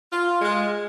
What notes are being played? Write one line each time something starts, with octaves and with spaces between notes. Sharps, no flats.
F4
G#3